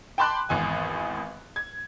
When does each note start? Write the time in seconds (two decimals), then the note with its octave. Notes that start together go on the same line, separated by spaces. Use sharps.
0.18 G5 A5 B5 C6 D6 F#6
0.49 G#1 E2 G#5
1.56 G#6